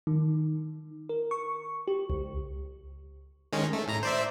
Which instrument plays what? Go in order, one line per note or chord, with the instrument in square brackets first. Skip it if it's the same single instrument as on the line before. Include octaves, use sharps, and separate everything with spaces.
[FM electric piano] D#3
A#4
C#6
G4
C#2
[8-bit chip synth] D#3 G#3 C#4
A3
A2 A#5
C5 D5 E5